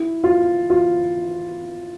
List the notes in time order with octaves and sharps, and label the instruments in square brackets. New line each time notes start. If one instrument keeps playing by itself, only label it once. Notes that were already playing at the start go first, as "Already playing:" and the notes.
Already playing: [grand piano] E4
F4
F4